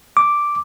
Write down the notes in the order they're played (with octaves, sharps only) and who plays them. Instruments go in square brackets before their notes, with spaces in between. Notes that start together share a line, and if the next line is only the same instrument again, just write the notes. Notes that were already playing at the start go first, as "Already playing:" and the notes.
[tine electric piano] D6